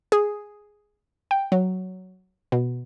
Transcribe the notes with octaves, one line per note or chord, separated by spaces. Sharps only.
G#4
G5
F#3
B2